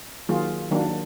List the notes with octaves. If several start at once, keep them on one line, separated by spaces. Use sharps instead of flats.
D#3 F#3 A#3 F4 G#4
D#3 F#3 A#3 D4